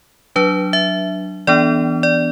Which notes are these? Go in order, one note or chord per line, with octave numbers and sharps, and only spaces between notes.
F#3 D4 B4
E5
E3 B3 D4 D5
D5